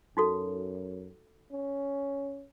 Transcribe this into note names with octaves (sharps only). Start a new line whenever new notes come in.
F#2 D#4 F#4 A4
C#4